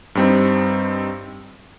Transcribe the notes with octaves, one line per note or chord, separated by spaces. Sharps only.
G2 G3 C4 D#4